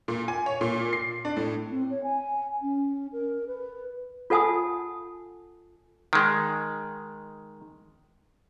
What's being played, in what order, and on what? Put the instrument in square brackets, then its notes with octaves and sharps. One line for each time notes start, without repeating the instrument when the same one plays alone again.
[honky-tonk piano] A#2
G#5
C#5
A#2
C7
D4
A2
[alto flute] C4
C#5
G#5
C#4
A#4
B4
[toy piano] F4 A4 F#5 G#5 A5 D#6
[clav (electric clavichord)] D#3 G#3